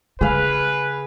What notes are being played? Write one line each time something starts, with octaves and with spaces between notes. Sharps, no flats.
C#3 G#4 B4 F5